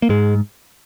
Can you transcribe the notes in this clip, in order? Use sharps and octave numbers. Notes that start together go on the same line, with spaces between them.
A#3
G#2 G#3